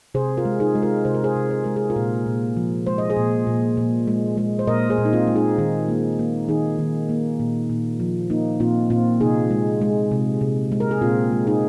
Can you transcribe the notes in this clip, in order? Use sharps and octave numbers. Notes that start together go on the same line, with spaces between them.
C3 G#4 C5
F4 A#4
G#3
D#4 G#4
G#3
F4 A#4
C3 C5
A#4
G#4 C5
C3
C5
G#3 A#4
G#4
F4 A#4
A#2
A#2
F3
G#3 C5
D#5
G#4 C5
A#2
A#2
A#2
G#3
G#3
C5
A#2 A#4 D#5
G#4 C5
A#2
D#4
C4 F4
G#3
D#4 G#4
D#3 D#4
A#3
A#3
D#3 D#4 G#4
D#3
A#3
A#2
A#2
F3
A#3 D#4
A#2 C4 F4
A#2 C4 F4
C3 D#4 G#4
G#3
G#3
C3
C3
G#3
A#4
G#4
A#2 C4 F4
G#3
D#4 G#4